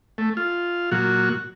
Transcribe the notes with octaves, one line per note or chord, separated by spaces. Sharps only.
A3
F4
A#2 F#3 F#4